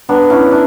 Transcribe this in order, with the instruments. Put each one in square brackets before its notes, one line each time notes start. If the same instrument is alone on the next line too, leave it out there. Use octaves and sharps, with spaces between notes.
[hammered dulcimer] B3 D4
C#4 E4
D4